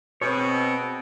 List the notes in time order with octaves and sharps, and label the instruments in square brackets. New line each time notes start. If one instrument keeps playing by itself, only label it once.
[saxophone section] B2 [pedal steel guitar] C4 G#4 C#5